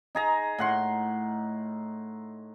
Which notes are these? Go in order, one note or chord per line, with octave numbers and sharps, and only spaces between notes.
D#4 G#4 A#5
A2 F#5 C6